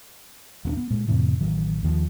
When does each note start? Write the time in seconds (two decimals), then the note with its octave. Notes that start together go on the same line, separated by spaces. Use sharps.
0.65 D#1 C4 D4
0.77 B3
0.90 A#2 G#3
1.08 F2 A2 C3 E3
1.41 A1 D#3 F#3
1.83 D#2 D#3 F3